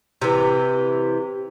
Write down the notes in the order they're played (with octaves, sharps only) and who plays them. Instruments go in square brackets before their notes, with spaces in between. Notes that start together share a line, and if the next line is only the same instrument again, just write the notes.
[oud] C3 E3